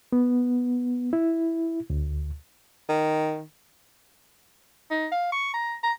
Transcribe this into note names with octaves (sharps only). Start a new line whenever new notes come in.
B3
E4
D2
D#3
D#4
F5
C#6
A#5
A#5